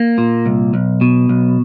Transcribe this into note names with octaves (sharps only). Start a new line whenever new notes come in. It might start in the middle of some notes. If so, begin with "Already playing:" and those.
Already playing: A#3
A#2
C2
B1
B2
B1